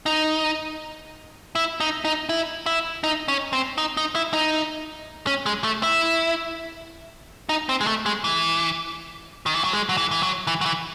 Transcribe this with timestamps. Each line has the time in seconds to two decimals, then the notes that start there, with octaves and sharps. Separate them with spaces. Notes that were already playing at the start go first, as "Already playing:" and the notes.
0.06 D#4
1.55 E4
1.80 D#4
2.05 D#4
2.29 E4
2.66 E4
3.04 D#4
3.28 C#4
3.53 C4
3.78 D#4
3.97 D#4
4.15 E4
4.33 D#4
5.27 C#4
5.46 G#3
5.64 A3
5.83 E4
7.49 D#4
7.69 C4
7.81 G#3
7.87 A3
8.06 G#3
8.24 E3
9.46 D#3
9.55 E3
9.64 F#3
9.73 G#3
9.89 F#3
9.97 E3
10.11 E3
10.23 F#3
10.47 E3
10.61 F#3
10.65 E3